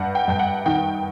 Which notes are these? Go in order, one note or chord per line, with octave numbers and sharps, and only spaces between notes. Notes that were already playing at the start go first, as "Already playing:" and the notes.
Already playing: G2 F#5
G5
G2 G5
F#5
D#3 G5